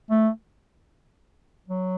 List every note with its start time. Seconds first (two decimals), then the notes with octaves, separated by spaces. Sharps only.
0.10 A3
1.68 F#3